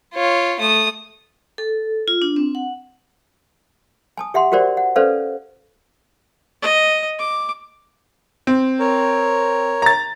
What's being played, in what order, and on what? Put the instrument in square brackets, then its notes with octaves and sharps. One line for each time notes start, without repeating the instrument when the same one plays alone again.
[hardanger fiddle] F4 C#5
A3 D#6
[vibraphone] A4
F4
D4
C4
F#5
[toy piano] G#5 A5 D#6
G4 E5 F#5 C6
F#4 G4 A#4 C5 D5 F#5
F#5
C#4 A4 B4 C5 D5 F5
[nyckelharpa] D#5
D6
[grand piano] C4
[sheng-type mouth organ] A#4 C#5
[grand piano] A#5 A6